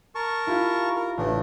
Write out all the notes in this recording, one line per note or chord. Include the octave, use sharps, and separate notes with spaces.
A#4 A5 C#6
E4 F4 G4
A#4
A1 A3 D4